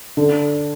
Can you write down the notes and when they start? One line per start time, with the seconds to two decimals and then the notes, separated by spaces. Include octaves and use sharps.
0.17 D3